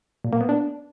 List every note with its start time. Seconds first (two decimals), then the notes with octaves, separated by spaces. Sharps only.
0.24 A#2
0.33 A#3
0.41 B3
0.49 D4